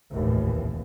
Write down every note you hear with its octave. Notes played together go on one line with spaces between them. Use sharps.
F1 A#1 D#2 A2 E3